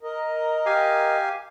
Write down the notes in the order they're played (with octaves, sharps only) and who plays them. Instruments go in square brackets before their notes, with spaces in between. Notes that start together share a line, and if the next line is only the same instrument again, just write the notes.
[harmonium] A#4 D#5
[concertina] G4 F5 G#5